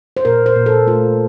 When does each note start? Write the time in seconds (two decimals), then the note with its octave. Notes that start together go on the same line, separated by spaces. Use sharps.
0.17 C5
0.25 A#2 A#4
0.46 C5
0.56 A#2
0.66 A4
0.87 A3 F4